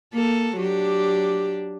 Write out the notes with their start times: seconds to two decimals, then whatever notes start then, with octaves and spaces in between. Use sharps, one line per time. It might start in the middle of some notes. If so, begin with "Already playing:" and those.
0.14 A#3 A4
0.58 F#3 D4 G4